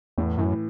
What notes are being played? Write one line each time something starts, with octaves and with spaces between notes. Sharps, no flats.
E2 A2
F#2 E3